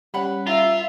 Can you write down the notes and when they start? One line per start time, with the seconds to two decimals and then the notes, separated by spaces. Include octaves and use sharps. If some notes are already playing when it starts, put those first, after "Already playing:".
0.14 G3 C#4 B4 F#5 B5
0.47 F4 A#4 E5 A#5